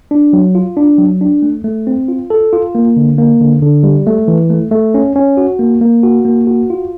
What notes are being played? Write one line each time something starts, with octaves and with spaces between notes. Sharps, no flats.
D4
F#3
F4
D4
F#3
D4
A3
A3
C4
F4
A4
F4
A#3
D3
A#3
D3
D3
G3
A3
E3
A3
A3
C#4
C#4
F#4
A#3
A#3
F#4
A#3
F#4
F4